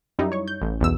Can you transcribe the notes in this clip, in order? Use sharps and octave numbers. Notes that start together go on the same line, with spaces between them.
F#2 G3 D#4 E4
C#5 C#6
G6
A1
B1 E2 E6